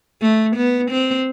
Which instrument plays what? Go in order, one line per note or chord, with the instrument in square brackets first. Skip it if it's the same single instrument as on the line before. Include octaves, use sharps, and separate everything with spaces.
[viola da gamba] A3
B3
C4